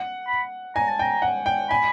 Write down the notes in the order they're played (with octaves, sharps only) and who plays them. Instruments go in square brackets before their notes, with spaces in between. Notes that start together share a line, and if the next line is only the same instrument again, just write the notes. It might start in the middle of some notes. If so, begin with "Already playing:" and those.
Already playing: [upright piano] F#5
[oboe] B5
[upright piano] G#5 [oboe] A#5
[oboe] A5
[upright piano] G5 [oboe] A#5
[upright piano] F#5
G5
[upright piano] G#5 [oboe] B5